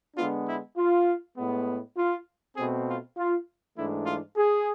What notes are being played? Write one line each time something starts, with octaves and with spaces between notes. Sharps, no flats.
D3 G#3 B3 D4 F4
E4
F4
A2 G#3 B3
F4
B2 A3 C4 G#4
F4
F4
G#2 E3 A3 D4 E4
F4
G#4